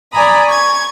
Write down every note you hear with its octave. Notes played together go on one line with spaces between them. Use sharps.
D5 G#5 A#5 B5 D#6
C#6 G#6